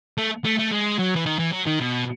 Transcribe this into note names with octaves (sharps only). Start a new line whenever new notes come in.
A3
A3
A3
G#3
F#3
E3
D#3
E3
F#3
D#3
B2